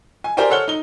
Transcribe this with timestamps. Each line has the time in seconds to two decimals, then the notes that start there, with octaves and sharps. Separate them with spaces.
0.24 G#5
0.37 G4 A#4 C5 D5 G5 G#5
0.50 A4 C#5 F#5 F6 G7
0.68 D#4 G7